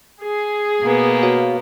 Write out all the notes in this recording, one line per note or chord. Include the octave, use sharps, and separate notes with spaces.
G#4
B2 A#3 B3
F#4 C#5 F5